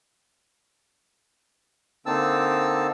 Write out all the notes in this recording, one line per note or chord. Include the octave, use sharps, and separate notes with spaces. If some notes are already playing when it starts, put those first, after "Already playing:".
D3 A#3 C4 D#4 A5 E6